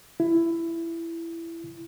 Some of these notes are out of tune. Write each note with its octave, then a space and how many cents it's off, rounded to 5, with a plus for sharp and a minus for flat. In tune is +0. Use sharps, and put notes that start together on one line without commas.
E4 +15